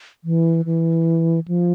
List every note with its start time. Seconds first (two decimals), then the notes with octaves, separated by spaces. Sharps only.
0.24 E3
0.65 E3
1.48 F3